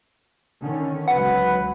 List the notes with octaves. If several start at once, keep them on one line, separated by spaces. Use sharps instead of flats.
D3 D#3 C#4
C#2 F#3 B4 F#5